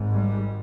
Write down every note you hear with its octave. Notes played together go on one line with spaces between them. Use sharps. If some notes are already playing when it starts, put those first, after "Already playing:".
Already playing: G#1 G#2
G3